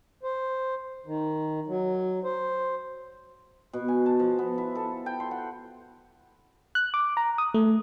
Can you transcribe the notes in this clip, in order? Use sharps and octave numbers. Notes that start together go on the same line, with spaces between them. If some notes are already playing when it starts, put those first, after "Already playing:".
C5
D#3
F#3
C5
B2
G#5
A5
F3
B3
E4
A4
G5
C6
F#5
F#6
D6
A#5
D#6
A3